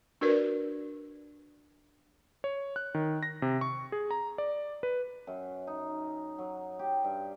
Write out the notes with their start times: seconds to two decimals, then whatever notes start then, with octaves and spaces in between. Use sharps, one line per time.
0.21 D4 F#4 A#4 B4 D5
2.44 C#5
2.76 F#6
2.94 D#3
3.23 A#6
3.42 C3
3.61 C#6
3.92 G#4
4.11 A#5
4.38 D5
4.83 B4
5.27 F#2
5.67 D#4
6.38 F#3
6.79 G4
7.04 G2